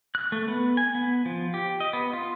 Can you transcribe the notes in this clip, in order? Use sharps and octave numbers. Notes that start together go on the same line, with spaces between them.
F#6
A3
B3
G#5
B3
F3
G4
D#5
B3
F4